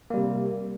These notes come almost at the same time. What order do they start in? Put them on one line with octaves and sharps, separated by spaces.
A#3 G3 C3